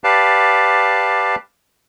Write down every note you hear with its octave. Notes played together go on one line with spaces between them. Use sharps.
G4 B4 D5 F5 A5